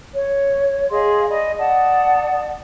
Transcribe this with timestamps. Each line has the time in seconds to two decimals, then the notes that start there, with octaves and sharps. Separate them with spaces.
0.14 C#5
0.90 G#4 D#5 F5 C6
1.29 D5 D#5 B5
1.58 D5 F#5 A5 D#6